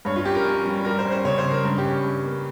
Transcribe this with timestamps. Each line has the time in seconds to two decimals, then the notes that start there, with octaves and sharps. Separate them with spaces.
0.05 G2 C#5
0.16 F4
0.25 C#4 G4
0.35 A#4
0.45 C#4
0.66 G3
0.85 G3 A#4
0.99 C5
1.05 C#4
1.11 C5
1.25 C#3 C#5
1.38 C5
1.44 C#3
1.51 A#4
1.64 G2
1.78 G4
1.85 C#4
2.04 G2
2.25 A#3